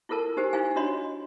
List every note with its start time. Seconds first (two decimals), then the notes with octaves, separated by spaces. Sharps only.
0.09 E4 F4 A4 A#4 A5
0.37 D#4 G4 C5 G#5
0.53 D#4 E4 F5 G#5
0.76 D4 F#4 C#5 D#5 B5 C6